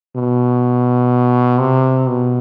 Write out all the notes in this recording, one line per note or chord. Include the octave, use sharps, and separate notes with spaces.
B2
C3
B2